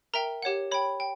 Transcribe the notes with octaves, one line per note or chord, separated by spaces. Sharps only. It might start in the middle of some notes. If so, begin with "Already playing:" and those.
A#4 E5 G5 A#5
G4 C#5 F#5
C#5 G5 B5
G5